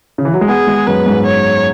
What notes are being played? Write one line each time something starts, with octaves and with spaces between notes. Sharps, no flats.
C#3
E3
F#3
G#3
B3 G#4
G#3
F#2 B4
G#2
C#5